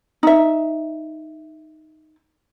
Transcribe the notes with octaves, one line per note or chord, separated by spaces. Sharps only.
D#4 E5